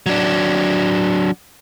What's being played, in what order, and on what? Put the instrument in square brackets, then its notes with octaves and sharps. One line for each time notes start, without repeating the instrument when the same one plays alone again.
[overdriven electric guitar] F#3 D4